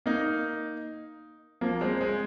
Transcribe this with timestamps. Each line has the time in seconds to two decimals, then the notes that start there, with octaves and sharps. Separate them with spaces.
0.06 A#3 D#4
1.61 F3 A#3
1.81 G#3 C4
2.01 G#3 C4